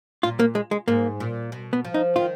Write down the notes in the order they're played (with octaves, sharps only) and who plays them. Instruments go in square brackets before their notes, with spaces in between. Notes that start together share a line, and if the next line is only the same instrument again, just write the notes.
[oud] A#2 [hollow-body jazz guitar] F4
[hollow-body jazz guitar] A#3
G#3
G#3
[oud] G#2 [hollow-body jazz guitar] A#3
[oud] A#2
B2
[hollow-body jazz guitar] B3
[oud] F3
[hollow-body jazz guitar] D#4
[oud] D#3 [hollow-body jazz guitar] F4